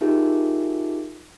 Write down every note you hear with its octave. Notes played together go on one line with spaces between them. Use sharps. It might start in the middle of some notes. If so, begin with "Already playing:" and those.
D#4 F4 G4 G#4 A#4 E5